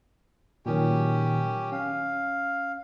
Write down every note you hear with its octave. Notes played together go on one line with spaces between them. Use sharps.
A#2 D#3 F#3 C#4 G4
C#4 F5